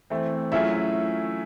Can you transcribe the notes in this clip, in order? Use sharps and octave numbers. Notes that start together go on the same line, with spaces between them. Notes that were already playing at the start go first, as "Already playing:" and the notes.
E3 A3 C4
F#3 A3 C#4 E4 F4 G#4 E5